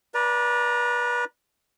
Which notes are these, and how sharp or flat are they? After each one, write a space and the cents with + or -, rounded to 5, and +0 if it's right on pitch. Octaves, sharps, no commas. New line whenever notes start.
B4 -30 D5 +0 A#5 +0